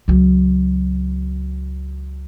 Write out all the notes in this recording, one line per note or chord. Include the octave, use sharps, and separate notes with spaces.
C#2 F#3